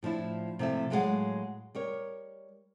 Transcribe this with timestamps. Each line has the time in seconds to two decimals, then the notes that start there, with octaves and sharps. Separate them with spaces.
0.03 A2 F3 D4 E4
0.59 C3 F3 A3 E4 E5
0.90 A2 F#3 G#3 B4 F5 F#5
1.75 G3 A#4 C#5